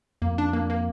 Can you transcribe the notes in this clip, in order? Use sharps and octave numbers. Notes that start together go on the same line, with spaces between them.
F2 A#3
D4
A#3
A#3